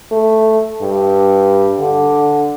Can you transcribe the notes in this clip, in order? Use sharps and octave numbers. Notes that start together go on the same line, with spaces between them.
A3
G2
D3